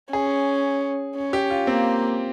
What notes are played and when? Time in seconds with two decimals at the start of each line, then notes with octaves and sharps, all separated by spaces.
0.13 C#4 G#4
1.16 C#4
1.33 G4
1.50 F4
1.67 A#3 C4